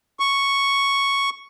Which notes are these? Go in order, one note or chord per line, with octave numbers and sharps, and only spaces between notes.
C#6